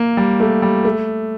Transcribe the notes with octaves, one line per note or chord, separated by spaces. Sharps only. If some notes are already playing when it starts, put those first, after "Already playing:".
Already playing: A#3
G3
A3
G3
A3